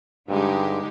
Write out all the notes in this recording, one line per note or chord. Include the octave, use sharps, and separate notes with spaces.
G2 D3 G#3 D#4 G4